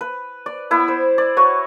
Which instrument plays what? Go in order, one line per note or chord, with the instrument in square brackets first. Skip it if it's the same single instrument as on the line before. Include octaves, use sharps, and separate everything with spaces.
[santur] B4
D5
B3 E4 B4
C5
D5
F#4 B4 C#5